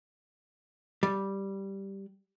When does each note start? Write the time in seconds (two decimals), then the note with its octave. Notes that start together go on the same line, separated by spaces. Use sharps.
1.03 G3